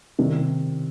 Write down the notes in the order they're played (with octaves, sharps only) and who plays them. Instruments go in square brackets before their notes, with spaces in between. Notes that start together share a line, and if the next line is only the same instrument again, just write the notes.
[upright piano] C3 D#3 G3